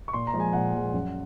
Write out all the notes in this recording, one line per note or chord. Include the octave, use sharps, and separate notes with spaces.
C#6
A#2 C6
A#5
F3 G#3
G#5
A#2 F#5
F3 G#3
F#2